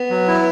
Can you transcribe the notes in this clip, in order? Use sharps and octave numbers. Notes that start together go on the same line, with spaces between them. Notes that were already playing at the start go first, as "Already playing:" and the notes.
Already playing: B3
F#3
E4